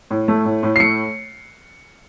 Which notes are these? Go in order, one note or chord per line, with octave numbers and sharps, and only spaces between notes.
A2
A3
A2
A2
C7
A3 C#7